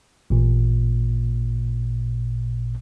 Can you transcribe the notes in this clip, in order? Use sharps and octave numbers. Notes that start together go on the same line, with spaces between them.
A1 A#2